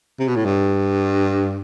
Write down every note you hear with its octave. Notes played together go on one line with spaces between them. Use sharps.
C3
B2
A2
G2